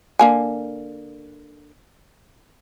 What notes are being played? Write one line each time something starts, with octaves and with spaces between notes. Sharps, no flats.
D3 A#3 G#5